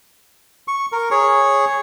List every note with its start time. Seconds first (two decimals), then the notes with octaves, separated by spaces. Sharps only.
0.68 C#6
0.92 A#4
1.11 G#4 C#5 C#6